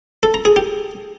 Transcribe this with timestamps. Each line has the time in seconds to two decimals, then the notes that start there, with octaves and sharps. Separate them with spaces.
0.23 A4
0.34 A#5
0.45 G#4
0.56 G4